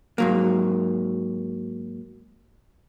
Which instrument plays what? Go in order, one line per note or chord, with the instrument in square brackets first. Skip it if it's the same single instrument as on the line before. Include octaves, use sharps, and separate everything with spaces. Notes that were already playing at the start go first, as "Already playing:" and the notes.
[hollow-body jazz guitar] G#2 F#3 A#3